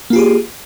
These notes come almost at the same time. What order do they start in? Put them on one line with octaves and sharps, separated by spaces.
A#3 F4 G4 G#4